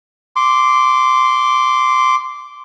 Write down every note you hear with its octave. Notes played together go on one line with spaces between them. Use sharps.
C6 D6